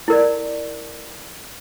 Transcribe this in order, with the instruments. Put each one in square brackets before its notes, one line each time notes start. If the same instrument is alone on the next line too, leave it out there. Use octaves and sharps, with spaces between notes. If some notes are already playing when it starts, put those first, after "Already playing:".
[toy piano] E4 A#4 D5